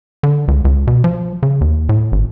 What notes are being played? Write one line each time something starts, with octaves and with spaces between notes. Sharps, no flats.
D3
C#2
C#2
B2
F3
C#3
D#2
A2
G#1